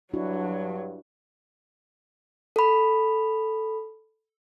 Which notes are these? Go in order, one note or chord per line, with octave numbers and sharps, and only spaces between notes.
G2 F#3 D4 E4 F#4
A4 B5